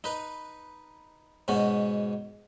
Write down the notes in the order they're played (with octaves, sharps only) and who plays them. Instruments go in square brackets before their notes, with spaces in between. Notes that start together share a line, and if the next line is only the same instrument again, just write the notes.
[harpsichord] D#4 B4
G#2 B2 C#4 F#4